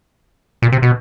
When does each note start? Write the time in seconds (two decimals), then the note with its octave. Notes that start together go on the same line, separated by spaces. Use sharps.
0.62 A#2
0.72 C3
0.82 B2